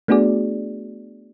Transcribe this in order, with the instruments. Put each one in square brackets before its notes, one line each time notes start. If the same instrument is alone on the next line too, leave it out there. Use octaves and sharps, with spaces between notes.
[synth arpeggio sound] A3 B3 D4 F#4 G#4 D5